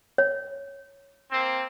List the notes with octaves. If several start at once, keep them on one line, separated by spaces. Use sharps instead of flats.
C#5
A#3 C4